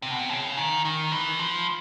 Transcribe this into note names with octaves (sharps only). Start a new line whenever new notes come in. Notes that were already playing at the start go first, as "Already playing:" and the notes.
C3
B2
C3
C#3
D#3
D#3
E3
F3